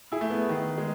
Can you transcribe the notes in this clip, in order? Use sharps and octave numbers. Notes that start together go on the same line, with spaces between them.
E4 G#4
A3
B3
D#3
G#3